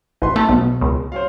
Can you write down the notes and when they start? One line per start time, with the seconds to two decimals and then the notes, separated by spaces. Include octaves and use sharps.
0.22 A1 B4 C6
0.36 A3 A5
0.49 B1 B2
0.81 C#2
1.12 C5 C#5 F5